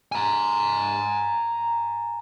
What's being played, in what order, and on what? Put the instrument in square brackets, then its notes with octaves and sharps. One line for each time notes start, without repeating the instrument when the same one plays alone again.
[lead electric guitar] G#5 A#5